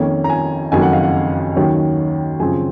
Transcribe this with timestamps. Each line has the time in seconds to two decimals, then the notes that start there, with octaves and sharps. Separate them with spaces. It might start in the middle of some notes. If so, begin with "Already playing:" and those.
Already playing: F2 D#3 A#3 C#4
0.24 A#5
0.30 G#5
0.72 F#1 F2 D#3 F#3 A#3 G#5
0.82 F#5
0.93 F5
1.03 F#5
1.56 D#2 D#3 F#3 C#4
2.40 F#2 C#3 F3 C4 G#5